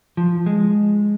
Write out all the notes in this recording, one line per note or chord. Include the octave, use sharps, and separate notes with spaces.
F3
G#3